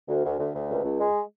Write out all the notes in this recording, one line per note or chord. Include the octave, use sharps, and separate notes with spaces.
D2
D2
D2
D2
C#2
C#2
G#3